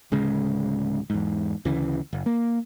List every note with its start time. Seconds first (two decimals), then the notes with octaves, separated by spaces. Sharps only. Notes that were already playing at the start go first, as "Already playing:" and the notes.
0.12 D1 C#3 G#3
1.10 E2 G#2
1.65 D2 C#3 E3
2.13 F#1
2.26 A#3